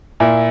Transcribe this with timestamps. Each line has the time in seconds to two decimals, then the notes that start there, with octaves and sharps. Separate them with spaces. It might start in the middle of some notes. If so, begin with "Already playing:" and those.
0.20 A#2 E4